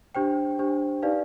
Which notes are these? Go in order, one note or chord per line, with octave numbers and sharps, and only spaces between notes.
D4 G4 C5 G5
D4 G4 C5
D#4 G4 B4 D5 F5